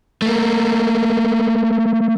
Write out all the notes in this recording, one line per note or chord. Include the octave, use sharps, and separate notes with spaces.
A3 A#3